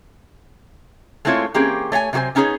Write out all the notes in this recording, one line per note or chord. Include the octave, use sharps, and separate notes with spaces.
G#3 A3 C4 E4 F4 C#5
E3 A#3 C4 C#4 G4 G#4
A3 C#5 F#5 G#5
C3 F#3 F#4 C5 G#5
B3 C#4 D#4 F4 G#4 C#5